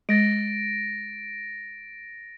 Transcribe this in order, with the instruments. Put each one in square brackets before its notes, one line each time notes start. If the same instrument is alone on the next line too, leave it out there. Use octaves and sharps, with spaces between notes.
[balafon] G#3 [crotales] A6 A#6 D7